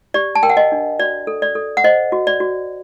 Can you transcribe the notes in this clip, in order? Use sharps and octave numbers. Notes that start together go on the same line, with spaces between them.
G4 D5
A5
A#4 G5
F#5
D#5
D4
F#4 D5
A4
D5
A4
F#5
C5 D#5
F#4
D5
F#4